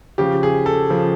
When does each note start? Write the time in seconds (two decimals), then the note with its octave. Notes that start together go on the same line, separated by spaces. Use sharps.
0.18 C#3 F3 G4
0.43 G#4
0.66 A4
0.90 C#3 F3